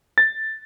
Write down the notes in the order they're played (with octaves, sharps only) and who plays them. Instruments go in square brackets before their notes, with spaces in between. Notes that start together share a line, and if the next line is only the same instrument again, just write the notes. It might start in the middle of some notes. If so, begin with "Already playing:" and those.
[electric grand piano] A6